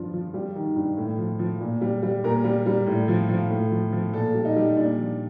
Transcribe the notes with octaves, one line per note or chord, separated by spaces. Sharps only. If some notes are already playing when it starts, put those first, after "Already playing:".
Already playing: G2 F3 F4
F3
G3
D#3
G2
A2
F3
F3
A#2
G3
G3
A#2 A#4
G3
G3
A2
F3
F3
A2
F3
F3
A#2 A4
G3
D#4
G3
A#2 D4
F3